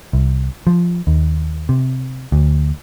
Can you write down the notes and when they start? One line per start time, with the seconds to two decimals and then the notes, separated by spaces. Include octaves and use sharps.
0.13 C2
0.67 F3
1.07 D#2
1.69 C3
2.32 D2